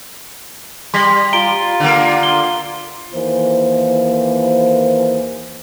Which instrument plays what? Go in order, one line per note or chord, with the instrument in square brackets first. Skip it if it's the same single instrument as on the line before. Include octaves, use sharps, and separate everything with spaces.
[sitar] G3 [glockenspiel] C6 B6
[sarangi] F4 [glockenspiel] A#5 D7 G7
[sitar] D3 A#3
[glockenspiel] G7
[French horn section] D#2 E3 A#3 C5